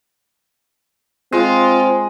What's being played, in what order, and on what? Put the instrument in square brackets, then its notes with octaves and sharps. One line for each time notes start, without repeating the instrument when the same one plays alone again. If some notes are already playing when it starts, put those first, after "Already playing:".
[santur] G#3 [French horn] C4 [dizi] F4